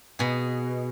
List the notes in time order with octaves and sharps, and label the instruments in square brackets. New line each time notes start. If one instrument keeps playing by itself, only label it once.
[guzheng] B2 G#4